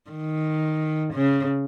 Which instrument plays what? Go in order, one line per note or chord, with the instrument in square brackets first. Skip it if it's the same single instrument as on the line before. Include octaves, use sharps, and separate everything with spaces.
[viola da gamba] D#3
C#3